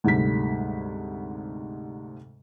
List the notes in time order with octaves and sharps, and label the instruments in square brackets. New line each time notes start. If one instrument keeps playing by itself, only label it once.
[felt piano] D2 G#2 C3 G3 B6